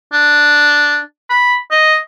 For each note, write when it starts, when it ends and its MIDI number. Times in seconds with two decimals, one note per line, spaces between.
0.13 1.00 62
1.30 1.56 83
1.71 1.97 75